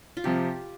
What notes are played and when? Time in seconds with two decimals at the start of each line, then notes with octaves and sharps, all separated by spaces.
0.17 F4
0.24 C3 F3 G4